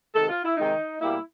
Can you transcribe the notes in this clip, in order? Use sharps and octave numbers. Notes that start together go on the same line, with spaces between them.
C3 D#3 G#3 A4
F4
E4
C3 D#3 G#3 D#4
B2 G3 A#3 E4